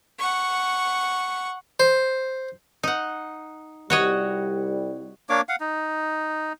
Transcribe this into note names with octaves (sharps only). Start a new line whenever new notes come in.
F#5 C#6
C5
D#4 F#5
C2 G3 F#4 C#5 D#5
A#3 D4 C#5 D6
F5 F#5
D#4